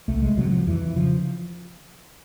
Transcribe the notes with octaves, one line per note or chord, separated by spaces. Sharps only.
C2 A3
G#3
C3 F#3
F3
F2 E3
C#3 F3